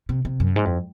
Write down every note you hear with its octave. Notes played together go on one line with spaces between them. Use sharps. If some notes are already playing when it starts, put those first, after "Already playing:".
C3
C3
F#2
G#2
F2